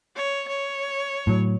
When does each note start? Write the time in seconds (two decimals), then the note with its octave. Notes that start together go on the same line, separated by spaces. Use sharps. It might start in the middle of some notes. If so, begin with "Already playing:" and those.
0.16 C#5
0.48 C#5
1.27 A2 F#3